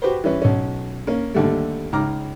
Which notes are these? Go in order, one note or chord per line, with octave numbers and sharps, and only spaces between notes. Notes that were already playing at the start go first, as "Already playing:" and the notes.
F#4 G4 B4 C5
E3 G3 C#4 B4
B1 C#4
A#3 C#4
D#2 D3 G3 A3
C#2 D#4 A#5 D6 F6